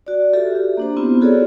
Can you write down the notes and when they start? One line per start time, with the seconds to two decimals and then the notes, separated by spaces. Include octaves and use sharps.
0.07 F#4 D5
0.33 F4 G4 A4 E5
0.55 G4
0.77 A#3 D4 C5
0.97 B3 C4 E4 F4
1.21 F4 F#4 G#4 A4 C#5 D5